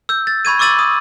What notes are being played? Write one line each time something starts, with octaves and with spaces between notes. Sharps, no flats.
E6 G6
A6
B5 C#6 G#6 D#7
C#6 D6 E6 A6 D#7 F#7
D#6